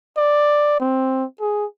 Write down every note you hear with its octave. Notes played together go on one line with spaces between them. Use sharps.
D5
C4
G#4